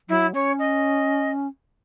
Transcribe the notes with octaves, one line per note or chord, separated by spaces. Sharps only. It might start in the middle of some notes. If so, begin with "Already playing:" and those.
F#3 E4
C#4 C#5
D#5